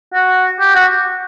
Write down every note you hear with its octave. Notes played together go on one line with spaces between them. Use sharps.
F#4
G4
F#4